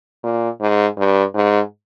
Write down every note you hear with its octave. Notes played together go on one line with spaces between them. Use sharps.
A#2
G#2
G2
G#2